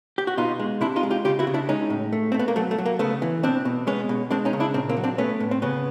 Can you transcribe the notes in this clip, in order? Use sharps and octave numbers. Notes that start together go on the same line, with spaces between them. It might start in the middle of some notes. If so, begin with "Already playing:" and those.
G4
F#4
B2 D#4 F4
G#3
C3 D4 E4
D#4 F4
G#3
F4 G4
C#3 F4 G4
E4 F#4
C#3
D4 E4
G#3 C#4 D#4
A2
A3
C4
A3
B3
A#3
F#3 A3
A3
F#3
A#3
C#3 A3 B3
E3
B2 C4 D4
B2
G#3 B3 C#4
B2
G#3 C4 D4
C#4 D#4
C#3
D4 E4
A#2 C4 D4
A#3 C4
F#3
C4 D4
A3 B3 C#4
A2
C4
C#3 B3 C#4